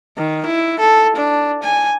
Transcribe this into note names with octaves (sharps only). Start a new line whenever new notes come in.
D#3
E4
A4
D4
G#5